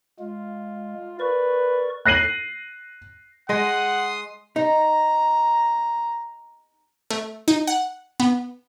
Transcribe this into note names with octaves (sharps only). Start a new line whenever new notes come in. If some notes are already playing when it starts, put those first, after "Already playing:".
G#3 F4
A#4 B4 D5 C#6
F#6 A#6 C7 D#7 F#7
G#3 D#5 F#5 C6 D#6
D#4 A#5
A3
D#4
F#5
B3